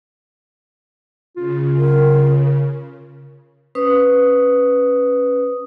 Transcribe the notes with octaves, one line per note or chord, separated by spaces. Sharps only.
C#3 F4
A#4
C#4 B4 C5 D#6